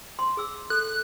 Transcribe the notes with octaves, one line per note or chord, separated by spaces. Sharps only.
C6
G#4 E6
A4 F#6